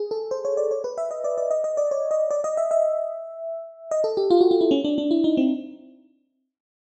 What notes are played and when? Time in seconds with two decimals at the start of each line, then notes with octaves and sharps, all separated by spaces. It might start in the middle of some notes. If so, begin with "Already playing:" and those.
Already playing: G#4
0.11 A4
0.31 C5
0.45 C#5
0.57 D5
0.71 C#5
0.84 B4
0.98 E5
1.11 D#5
1.24 D5
1.38 D5
1.51 D#5
1.64 D#5
1.77 D5
1.91 C#5
2.11 D#5
2.31 D5
2.44 D#5
2.57 E5
2.71 E5
3.91 D#5
4.04 A4
4.17 G4
4.30 F4
4.41 F#4
4.51 F4
4.61 E4
4.71 C#4
4.84 D4
4.98 D4
5.11 E4
5.24 D#4
5.37 C4